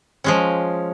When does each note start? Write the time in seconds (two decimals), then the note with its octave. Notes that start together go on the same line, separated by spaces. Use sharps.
0.24 F3 G#3 C#4